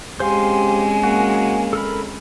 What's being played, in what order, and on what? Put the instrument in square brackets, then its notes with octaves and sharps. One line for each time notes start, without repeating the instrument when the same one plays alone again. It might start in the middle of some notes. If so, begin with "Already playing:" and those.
[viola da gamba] G#3 C4 C#4 [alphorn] G4 [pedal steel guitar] C5 F5 C6 [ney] G#5
[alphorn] A#3 [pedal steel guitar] F#4
[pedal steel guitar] A4 A#4 B5